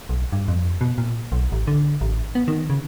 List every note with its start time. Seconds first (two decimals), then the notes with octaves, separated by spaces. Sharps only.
0.09 B1
0.32 G2
0.48 F2
0.81 B2
0.98 A#2
1.32 B1
1.52 A1
1.67 D3
2.01 A1
2.35 B3
2.48 D#3
2.70 C#3